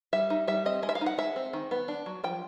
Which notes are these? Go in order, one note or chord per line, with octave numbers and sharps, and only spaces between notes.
G3 E5
D#4
G3 E5
C4 D#5
G#3 D#5
E5
F5
D#4
F#5
G#3 E5
C4
D#3
B3
D4
F#3
F3 G5